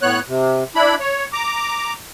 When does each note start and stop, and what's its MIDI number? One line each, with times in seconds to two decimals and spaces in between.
0.02 0.20 45
0.02 0.20 59
0.02 0.20 73
0.02 0.20 90
0.28 0.64 48
0.75 0.95 62
0.75 0.95 64
0.75 0.95 83
1.00 1.26 73
1.33 1.94 82
1.33 1.94 86